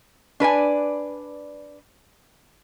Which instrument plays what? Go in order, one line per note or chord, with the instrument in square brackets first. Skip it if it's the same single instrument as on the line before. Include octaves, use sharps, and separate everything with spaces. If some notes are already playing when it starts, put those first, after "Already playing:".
[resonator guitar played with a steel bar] D4 B4 D5 G#5